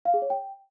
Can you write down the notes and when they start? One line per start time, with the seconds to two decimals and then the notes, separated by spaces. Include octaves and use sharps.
0.05 F5
0.14 G#4
0.22 C#5
0.30 G5